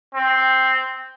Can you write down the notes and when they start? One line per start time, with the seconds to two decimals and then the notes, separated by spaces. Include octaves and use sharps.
0.15 C4